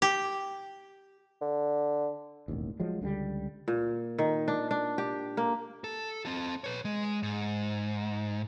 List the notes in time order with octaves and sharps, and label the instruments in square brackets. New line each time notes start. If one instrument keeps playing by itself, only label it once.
[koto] G4
[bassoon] D3
[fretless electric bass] E1 A1 D#2
F3 F#3 G#3
C#2 D3 D#3 G3
[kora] A#2
D#3
D4
D4
G4
A#3
[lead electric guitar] A4
C4 A4
B4 C#5
G#3
G#2